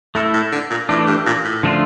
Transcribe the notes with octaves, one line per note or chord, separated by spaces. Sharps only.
A2 A3 E4 A4
A2
D3
A#2
A2 E3 A3 D4
G2
A#2
A2
D3 F3 A3 D4 F4